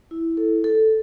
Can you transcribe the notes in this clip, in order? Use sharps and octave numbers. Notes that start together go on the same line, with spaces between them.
E4
A4
A4